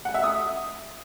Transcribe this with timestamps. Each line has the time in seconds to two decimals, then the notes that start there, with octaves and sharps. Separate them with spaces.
0.05 F#5
0.14 E5
0.24 D#6